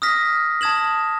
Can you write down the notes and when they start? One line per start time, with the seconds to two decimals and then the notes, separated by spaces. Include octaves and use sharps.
0.02 D#6 F6 A#6 B6
0.61 A5 D#6 G#6 E7 F#7